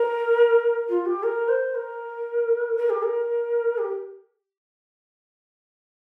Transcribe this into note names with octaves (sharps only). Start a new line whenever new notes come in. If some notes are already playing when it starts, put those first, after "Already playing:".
Already playing: A#4
F4
G4
A#4
C5
A#4
A#4
G4
A#4
G4